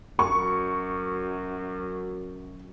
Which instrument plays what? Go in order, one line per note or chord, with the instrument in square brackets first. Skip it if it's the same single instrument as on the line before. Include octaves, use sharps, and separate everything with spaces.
[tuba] F#2 [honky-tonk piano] C#6